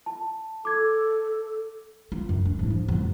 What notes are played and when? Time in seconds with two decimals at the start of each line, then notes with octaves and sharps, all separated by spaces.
0.06 A5
0.65 A4 D6 G#6
2.12 F4
2.29 F#2
2.45 D4
2.59 G#1 E4
2.70 F3
2.88 F2 F#3